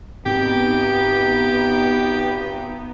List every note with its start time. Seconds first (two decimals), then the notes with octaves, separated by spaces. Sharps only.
0.26 G#2 B3 C4 D#4 G4 G5